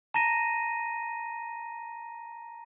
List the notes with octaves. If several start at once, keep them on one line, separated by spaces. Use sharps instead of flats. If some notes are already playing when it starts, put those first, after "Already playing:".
A5 A#5 A#6 D#7